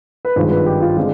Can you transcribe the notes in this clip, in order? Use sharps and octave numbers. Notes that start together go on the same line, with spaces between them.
B4
G#1 G2 F3 G#3 C5
B4
G4
F4
D3 G#3 C4 F4